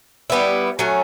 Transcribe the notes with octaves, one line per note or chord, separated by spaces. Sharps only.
G3 B3 E4
F#3 A3 C#4